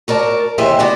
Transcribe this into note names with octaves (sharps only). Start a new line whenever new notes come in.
F#4 A#4 D5 A5
D#2 C3 E3 G4 C5 E5
B3 F#4 D5